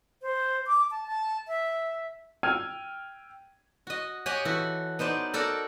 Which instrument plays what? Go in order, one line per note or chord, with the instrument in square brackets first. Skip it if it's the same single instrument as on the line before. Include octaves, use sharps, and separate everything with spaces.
[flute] C5
D6
A5
A5
E5
[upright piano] G5 E6 F6 G#6 D#7
[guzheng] F#4 D#5
G4 C#5 D#5 F#5 G#5
E3 F#4 A4
B3 D#4 C5 D5
F#4 A4 A#4 D5